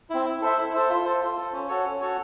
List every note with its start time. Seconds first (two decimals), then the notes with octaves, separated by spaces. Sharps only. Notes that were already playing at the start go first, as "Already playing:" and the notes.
0.10 C4 E4
0.25 E4
0.41 A4 C5 E5
0.57 E4
0.74 A4 C5 E5
0.89 F4
1.05 A4 C5
1.21 F4
1.37 A4 C5
1.53 C#4
1.68 F#4 A4 C#5
1.85 C#4
2.01 F#4 A4 C#5